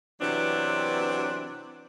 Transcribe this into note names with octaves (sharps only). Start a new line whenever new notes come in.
C3 E3 F#3 B3 C4 D4